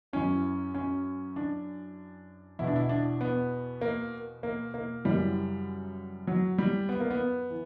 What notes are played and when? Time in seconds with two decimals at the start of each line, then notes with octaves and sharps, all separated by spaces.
0.13 F#2 E3 C#4
0.75 C#4
1.36 D4
2.59 E2 B2 E4
2.67 D4
2.76 E4
2.89 D4
3.21 B3
3.81 A#3
4.43 A#3
4.74 A#3
5.05 F#2 C#3 E3 G3
6.27 F#3
6.58 G3
6.89 B3
7.00 A#3
7.11 B3
7.50 E3